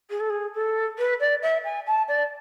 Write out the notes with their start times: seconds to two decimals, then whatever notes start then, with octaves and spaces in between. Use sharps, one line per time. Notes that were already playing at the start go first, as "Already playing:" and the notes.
0.10 G#4
0.20 A4
0.29 G#4
0.54 A4
0.98 B4
1.20 D5
1.42 E5
1.64 G#5
1.86 A5
2.08 D5